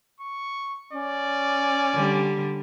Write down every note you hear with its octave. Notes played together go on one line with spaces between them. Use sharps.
C#6
C#4 D5
D3 G3